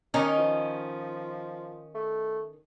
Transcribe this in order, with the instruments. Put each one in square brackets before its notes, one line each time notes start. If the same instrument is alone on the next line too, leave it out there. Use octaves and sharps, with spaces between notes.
[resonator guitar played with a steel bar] D#3 C#4 D#4
[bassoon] F3
A3